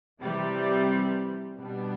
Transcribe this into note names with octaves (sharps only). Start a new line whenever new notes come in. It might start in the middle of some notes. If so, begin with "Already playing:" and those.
C3 E3 G3
B2 G3 B3 D4